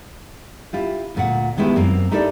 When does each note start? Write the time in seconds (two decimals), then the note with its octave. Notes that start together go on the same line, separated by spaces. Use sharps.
0.73 E4 F4 G4
1.15 D2 A#2 F#5
1.57 D#3 G#3 B3 E4 G4
1.76 F#2 A#3 C4 F#4
2.11 D#4 E4 G4 A4 A#4 D5